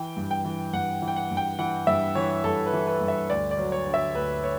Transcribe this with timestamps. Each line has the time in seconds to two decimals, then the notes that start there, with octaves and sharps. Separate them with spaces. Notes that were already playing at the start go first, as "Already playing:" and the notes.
Already playing: E3 G5
0.17 G2
0.31 G5
0.45 E3
0.73 G2 F#5
1.02 E3
1.08 G5
1.16 F#5
1.31 G2
1.37 G5
1.59 E3 F#5
1.87 G2 E5
2.15 E3 C#5
2.44 G2 A4
2.66 B4
2.73 E3
2.87 B4
3.01 G2
3.08 E5
3.30 D2 D5
3.51 D5
3.58 F#3
3.72 C#5
3.86 D3
3.94 E5
4.15 D2 B4
4.44 C#5